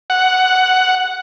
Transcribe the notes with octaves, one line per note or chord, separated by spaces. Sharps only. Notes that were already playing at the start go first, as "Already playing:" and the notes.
F#5